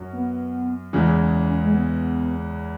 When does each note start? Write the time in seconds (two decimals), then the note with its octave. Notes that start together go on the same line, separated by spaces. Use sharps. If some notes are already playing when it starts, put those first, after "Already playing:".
Already playing: F#2 F#3 C#4
0.13 B3
0.93 E2 C#3 E3 G#3 C#4
1.63 G#3
1.73 B3